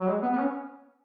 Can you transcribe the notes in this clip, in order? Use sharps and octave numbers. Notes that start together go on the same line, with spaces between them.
F#3
G#3
B3
B3
C#4